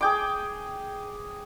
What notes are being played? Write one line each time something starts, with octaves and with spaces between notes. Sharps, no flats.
G#4 G5 D6